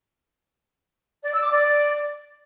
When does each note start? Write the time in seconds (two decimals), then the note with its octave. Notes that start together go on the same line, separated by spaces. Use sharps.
1.25 D5
1.34 E6
1.42 D6
1.51 D5